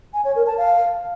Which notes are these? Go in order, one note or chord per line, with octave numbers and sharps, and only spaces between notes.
G#5
C#5
A#4
A5
F5